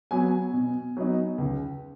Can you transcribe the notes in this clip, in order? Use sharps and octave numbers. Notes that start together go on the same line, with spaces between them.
F#3 B3 G#5
B2
F#3 B3 D#4
C#2